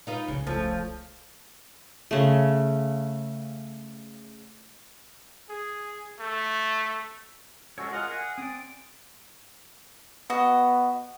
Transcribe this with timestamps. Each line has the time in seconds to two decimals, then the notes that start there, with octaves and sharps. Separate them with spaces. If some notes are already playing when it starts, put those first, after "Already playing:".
0.07 D#4 F4 B4
0.28 D#1 C2 C#3
0.47 F3 A3
2.11 C#3 A3
5.49 G#4
6.20 A3
7.78 G#3 C#4 F#4 A4 C#5
7.92 F4 G#4 A#4 D#5 F5 F#5
8.07 G#4 F#5 G#5
8.38 C4 D5 D#6
10.30 B3 F#4 D#5